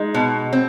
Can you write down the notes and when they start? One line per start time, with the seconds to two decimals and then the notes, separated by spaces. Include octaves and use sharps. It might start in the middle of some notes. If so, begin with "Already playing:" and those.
Already playing: G#3 D#4
0.14 B2
0.53 C4